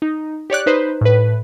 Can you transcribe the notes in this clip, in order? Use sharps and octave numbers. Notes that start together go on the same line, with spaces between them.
D#4
G4 C#5 D5 F#6
D#4 B4 C5
A2 B4